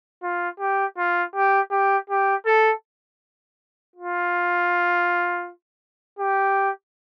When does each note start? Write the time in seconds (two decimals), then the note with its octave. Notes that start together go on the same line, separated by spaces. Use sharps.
0.23 F4
0.60 G4
0.98 F4
1.35 G4
1.71 G4
2.09 G4
2.46 A4
3.95 F4
6.19 G4